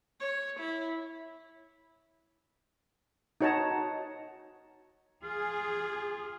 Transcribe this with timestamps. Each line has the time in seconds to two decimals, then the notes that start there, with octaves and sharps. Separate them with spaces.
0.20 C#5
0.59 E4
3.41 D#4 F#4 C#5 F#5 A5 A#5
5.24 F4 G#4